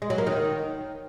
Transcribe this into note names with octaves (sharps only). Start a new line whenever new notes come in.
G#3
F#3
A#3
D#3